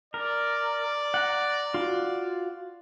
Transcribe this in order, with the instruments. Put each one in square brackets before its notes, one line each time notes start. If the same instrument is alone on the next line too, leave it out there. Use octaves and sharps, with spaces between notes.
[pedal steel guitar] A#4 [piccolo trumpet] D5
[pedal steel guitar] F#5 A#5
F4 F#4